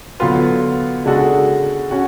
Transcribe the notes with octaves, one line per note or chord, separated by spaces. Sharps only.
D3 F#3 B3 F4 B4
C#3 G#3 D4 F#4 A4
C#4 F#4